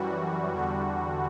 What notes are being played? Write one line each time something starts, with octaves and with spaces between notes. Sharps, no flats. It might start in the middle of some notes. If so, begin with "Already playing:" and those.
Already playing: F#2 E3 G3 F#4
E2 D3 G3